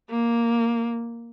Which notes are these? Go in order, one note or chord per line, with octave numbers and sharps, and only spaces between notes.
A#3